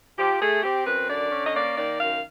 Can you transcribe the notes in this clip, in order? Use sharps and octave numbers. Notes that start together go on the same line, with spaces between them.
F3 G4
A3 G#4
C4 G4
F#2 B4
D3 D5
C#4
D#5
A#3 D5
D#3 D5
F#2 F5